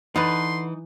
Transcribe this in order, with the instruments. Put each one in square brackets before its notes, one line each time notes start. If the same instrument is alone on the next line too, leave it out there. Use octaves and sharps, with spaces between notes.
[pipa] D3 A4 B4 [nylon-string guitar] E3 [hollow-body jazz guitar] D#4 [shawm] C6